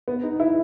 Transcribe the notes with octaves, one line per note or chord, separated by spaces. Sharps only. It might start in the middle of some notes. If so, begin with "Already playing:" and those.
B3
D#4
E4